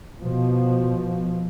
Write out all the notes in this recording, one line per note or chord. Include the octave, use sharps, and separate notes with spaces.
B2 F3